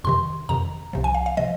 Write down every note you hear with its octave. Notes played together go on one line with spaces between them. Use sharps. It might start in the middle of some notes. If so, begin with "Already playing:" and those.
F2 C3 D#3 C6
F2 C3 D#3 A#5
C2 C3 F3
G#5
F5
F5
C3 F3 D#5